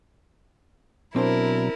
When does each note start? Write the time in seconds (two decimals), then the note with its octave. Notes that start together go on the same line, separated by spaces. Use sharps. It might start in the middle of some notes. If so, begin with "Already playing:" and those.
1.16 B2 F#3 C4 D4 E4 A#4 C5